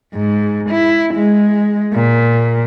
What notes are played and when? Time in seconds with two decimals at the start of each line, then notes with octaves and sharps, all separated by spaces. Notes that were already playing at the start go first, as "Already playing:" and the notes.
0.14 G#2
0.70 E4
1.15 G#3
1.94 A#2